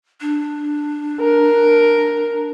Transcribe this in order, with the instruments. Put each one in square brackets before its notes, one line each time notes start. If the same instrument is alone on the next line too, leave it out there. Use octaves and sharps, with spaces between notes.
[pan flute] D4
[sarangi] A#4